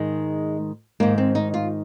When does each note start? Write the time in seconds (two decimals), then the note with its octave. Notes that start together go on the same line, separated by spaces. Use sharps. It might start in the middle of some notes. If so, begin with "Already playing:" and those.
Already playing: G#2 D#3 G#3
1.00 G#2 D#3 A#3
1.18 C4
1.35 D#4
1.54 F4